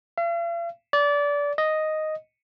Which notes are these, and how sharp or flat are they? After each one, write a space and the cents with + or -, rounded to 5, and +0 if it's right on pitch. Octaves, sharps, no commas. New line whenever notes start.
F5 -45
D5 -25
D#5 +0